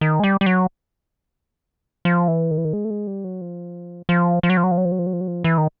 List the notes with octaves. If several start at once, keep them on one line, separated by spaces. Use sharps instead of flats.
D#3
G#3
G3
G3
F#3
F3
E3
D#3
E3
D#3
G#3
A3
G#3
G3
F#3
F3
F3
F3
F#3
F3
F#3
F3
F#3
F3
F#3
F3
F#3
F3
F#3
F3
E3
D#3